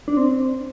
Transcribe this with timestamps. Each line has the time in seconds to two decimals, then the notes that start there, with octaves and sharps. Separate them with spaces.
0.08 D4
0.17 C4